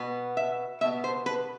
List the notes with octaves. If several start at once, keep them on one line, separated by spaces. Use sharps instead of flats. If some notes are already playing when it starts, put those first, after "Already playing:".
Already playing: B2 B3
E5
B2 B3 E5
C5
B4